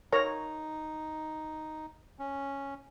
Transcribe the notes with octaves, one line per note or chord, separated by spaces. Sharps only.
D#4 A#4 C#5 A#5
C#4